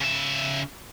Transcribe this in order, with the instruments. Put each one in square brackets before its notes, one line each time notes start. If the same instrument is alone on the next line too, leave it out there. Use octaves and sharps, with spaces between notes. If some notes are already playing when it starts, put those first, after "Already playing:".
[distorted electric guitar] C#3 E5